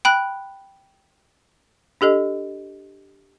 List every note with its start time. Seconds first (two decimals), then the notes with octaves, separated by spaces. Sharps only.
0.05 G5 B5 F#6
2.01 D4 G4 A4 D#5